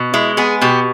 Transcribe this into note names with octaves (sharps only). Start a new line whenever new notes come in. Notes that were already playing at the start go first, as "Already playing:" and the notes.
Already playing: B2
G#3 E4
B3 G#4
B2 G4